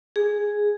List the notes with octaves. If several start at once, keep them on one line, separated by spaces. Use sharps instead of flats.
G#4